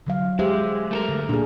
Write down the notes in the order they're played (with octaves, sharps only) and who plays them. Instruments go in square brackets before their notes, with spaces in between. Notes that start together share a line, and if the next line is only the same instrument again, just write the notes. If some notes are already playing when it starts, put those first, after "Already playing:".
[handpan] D3 F#3 F5
[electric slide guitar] G#3 [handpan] G4 C5 E5
[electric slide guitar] A3 A4 A#4
[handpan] D3
[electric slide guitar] A#2 [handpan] D4 G#4